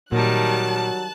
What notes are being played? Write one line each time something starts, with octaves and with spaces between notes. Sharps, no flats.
A#2 D#3 F#3 G3 A5 F#6